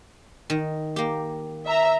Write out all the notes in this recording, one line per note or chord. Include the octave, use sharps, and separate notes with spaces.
D#3
A#3 G4
E5 A#5